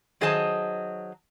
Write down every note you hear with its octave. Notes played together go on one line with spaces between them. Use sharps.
D#3 F#3 G#4 C5 D#5 A5